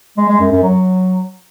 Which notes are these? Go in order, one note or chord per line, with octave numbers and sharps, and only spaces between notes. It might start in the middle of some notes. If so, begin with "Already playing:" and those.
G#3
G#3
F#2
F#2
F#3